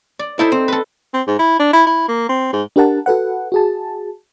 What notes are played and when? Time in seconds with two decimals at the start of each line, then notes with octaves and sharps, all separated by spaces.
0.19 D5
0.39 D#4 E4 A4 C5
0.52 C4
0.68 A4 B4
1.14 C4
1.27 G#2
1.39 E4
1.59 D4
1.73 E4
1.86 E4
2.08 A#3
2.29 C4
2.53 G#2
2.76 D4 G4 A#4 F#5 A5
3.06 F#4 A4 B4 F#5
3.52 F#4 G#4 A5